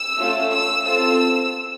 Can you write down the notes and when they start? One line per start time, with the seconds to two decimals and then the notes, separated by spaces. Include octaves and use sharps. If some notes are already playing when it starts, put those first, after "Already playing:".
Already playing: E6
0.16 A3 C#4 F4
0.51 E6
0.86 C4 F4 A4 E6